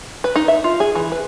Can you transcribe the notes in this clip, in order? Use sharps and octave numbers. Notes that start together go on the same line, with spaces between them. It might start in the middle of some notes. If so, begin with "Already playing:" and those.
B4
D#4
E5
F4
G#4
E3
B4